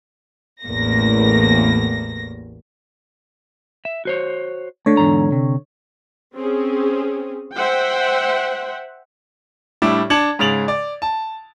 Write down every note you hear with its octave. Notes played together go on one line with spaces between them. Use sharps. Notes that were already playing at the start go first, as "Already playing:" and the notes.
A1 E2 A2 A#3 A#6
E5
F#4 C5 C#5
D3 A3 C#5
E2 G#2 A#5
C3
C4 C#4 G#4
C5 E5 F#5 G5
A2 G3 D4 E4
D4 A5 G#6 C#7 F#7
G#2 C#3 A6 F7 F#7
D5
A5